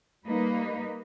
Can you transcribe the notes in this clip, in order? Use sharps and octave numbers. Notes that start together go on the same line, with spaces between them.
G3 A#3 D#4 B4